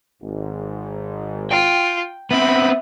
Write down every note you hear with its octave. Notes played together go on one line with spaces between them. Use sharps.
G#1 G#2
F4 G5
B3 C4 E5 B5